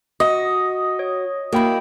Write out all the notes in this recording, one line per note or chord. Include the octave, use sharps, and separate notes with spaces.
F#4 D#5
C#5
A#3 E4 F#4 G5 B5